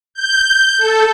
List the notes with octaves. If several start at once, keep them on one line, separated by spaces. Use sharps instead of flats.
G6
A4